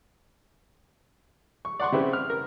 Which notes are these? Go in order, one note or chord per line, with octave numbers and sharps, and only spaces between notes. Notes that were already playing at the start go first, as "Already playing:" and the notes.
C#6
D5 F#5 C6 C#6
C#3 C4 E4 G4 B4
F6
A#4